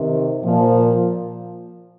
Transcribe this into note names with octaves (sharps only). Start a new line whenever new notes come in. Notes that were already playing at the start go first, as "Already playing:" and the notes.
Already playing: C3 D#3
A#2 F3